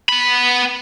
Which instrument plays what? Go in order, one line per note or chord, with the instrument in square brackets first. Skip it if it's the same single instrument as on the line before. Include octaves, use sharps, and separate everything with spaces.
[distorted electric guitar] B3 B5